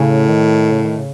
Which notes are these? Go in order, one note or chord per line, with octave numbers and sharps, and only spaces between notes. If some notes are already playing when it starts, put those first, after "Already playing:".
Already playing: A2 C#3
D#3
C#3
D#3
C#3